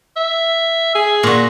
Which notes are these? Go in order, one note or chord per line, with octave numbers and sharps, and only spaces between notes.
E5
G#4
A#2 F#4